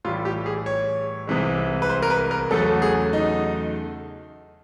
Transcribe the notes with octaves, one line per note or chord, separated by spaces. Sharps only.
A2 E3 G3 F4
G4
G#4
C#5
C2 C3 E3 G#3
B4
C5
A#4
B4
A#4
E2 C#3 F#3 A3 A4
G#4
D#4